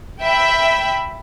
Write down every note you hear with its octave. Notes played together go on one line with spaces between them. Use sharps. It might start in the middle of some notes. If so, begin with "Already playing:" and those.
E5 G5 B5